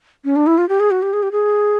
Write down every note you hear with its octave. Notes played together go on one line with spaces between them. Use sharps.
C#4
D4
E4
F4
G4
G#4
F#4
G4
G#4
G4
G#4